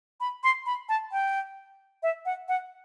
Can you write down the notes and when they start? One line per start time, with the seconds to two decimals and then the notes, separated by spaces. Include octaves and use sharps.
0.20 B5
0.44 C6
0.66 B5
0.89 A5
1.12 G5
2.03 E5
2.26 F#5
2.48 F#5